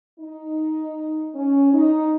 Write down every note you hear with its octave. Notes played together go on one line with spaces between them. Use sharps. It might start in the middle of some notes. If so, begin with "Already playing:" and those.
D#4
C#4
D#4